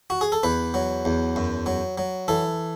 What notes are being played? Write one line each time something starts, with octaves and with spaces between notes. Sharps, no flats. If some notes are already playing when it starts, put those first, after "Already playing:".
F#4
G#4
A4
E2 B4
F#3
E2
F#2
F#3
F#3
E3 A4